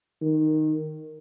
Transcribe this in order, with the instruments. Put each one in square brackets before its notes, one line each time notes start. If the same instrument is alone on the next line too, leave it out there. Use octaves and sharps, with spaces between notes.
[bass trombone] D#3